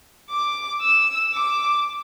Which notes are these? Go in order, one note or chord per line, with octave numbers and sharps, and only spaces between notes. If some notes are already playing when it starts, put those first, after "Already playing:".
D6
E6
D6